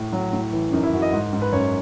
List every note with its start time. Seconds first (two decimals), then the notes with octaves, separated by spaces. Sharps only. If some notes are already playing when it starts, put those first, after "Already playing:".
Already playing: A2
0.12 F#3
0.33 A2
0.53 E3
0.68 C#4
0.73 F#2 D#4
0.83 E4
0.93 F#2 F#4
1.02 D#5
1.12 G#2
1.33 G#2
1.42 B4
1.53 F#2 C#5